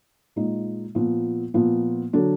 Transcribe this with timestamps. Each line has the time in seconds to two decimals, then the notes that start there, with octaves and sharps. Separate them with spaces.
0.36 A#2 G#3 D#4
0.95 A#2 F3 B3
1.54 A#2 F3 B3
2.13 D3 F#3 D4